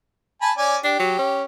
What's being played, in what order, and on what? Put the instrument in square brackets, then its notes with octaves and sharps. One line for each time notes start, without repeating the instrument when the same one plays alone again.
[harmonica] G#5 A5 B5
C#4 D5 G#5
[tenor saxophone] D4 [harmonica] G4
[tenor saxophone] F#3
C#4